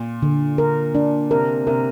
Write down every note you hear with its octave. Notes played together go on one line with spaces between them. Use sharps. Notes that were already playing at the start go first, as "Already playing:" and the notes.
Already playing: A#2
D3
A#4
D4
C3 A#4
C3 A#4